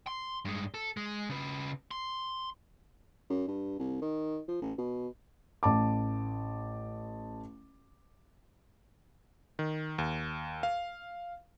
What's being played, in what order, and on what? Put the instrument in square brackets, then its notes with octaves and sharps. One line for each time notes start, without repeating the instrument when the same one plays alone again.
[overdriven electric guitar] C6
G2 G#3
A4
G#3
C#3 B4
C6
[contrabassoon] F#2
G2
C2
D#3
F3
A1
B2
[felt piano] A1 A5 D6
[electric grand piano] D#3
D#2
F5